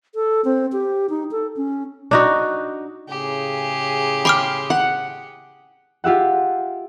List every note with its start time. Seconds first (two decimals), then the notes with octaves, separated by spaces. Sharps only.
0.15 A4
0.45 C4
0.73 G4
1.10 D#4
1.31 A4
1.57 C#4
2.11 D4 D#4 F#4
3.09 A2 C#3 G4 G#4
4.25 G5 B5 C6 D6 F6
4.70 F#5
6.04 F4 G4 E5 F#5